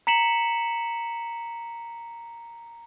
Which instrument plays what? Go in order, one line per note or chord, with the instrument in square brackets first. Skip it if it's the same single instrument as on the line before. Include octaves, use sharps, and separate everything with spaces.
[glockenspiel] A#5 B6 C#7 E7 F#7